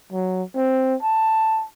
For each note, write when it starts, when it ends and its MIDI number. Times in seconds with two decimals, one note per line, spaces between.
0.12 0.43 54
0.56 0.95 60
1.03 1.65 81